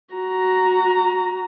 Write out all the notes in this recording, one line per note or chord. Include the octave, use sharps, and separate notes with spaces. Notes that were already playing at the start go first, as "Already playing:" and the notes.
F#4 A#5